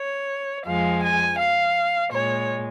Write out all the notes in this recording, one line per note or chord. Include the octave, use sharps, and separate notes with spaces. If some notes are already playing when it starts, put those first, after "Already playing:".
Already playing: C#5
F2 F3 G#3 F5
G#5
F5
A#2 G#3 C#5